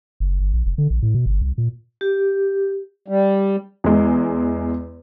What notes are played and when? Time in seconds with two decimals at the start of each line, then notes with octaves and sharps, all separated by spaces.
0.20 F#1
0.40 G1
0.54 A#1
0.66 F1
0.78 D3
0.90 A#1
1.02 A2
1.15 B2
1.26 G1
1.42 C2
1.58 A#2
2.01 G4
3.08 G3
3.84 E2 G#3